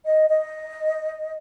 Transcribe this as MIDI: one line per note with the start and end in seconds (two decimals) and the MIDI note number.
0.05 0.27 75
0.28 1.36 75